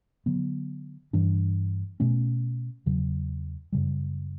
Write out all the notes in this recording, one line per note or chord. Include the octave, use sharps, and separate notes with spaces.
D3 F#3 B3
G2 E3 G3 D4
B2 A3 C#4
E2 C#3 F#3
F#2 C#3 G3